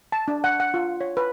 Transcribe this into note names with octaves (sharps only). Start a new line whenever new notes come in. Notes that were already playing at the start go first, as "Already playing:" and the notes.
A5
D4
F#5
F#5
F4
C#5
B4